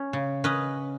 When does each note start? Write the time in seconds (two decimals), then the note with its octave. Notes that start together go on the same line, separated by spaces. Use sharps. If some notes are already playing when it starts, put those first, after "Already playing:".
Already playing: C#4
0.13 C#3
0.44 C#4 B4 D#5